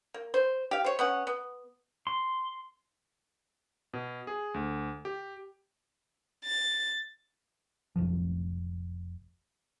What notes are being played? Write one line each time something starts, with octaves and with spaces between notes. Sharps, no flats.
A#3
C5
G4 F5
C5 C#5
B3 C#4 F#5
B3
C6
B2
G#4
D2
G4
A6
F1 B1 F3